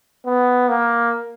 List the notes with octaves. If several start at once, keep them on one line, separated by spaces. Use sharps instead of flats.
B3
A#3